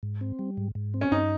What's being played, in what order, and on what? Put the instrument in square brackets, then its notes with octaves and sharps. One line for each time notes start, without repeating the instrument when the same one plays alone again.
[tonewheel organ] G#2
C4
G3
G#2
G#2
C4
[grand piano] C#4
[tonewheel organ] G2 [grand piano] D#4